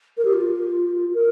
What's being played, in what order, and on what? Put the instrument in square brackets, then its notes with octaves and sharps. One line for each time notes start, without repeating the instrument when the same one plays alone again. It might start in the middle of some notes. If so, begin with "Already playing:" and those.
[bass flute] A#4
G4
F4
A#4